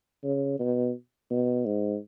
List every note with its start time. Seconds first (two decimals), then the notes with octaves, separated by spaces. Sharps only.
0.24 C#3
0.59 B2
1.30 B2
1.65 G#2